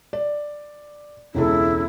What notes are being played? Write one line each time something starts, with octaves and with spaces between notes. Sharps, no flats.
D5
E1 C#2 E4 A4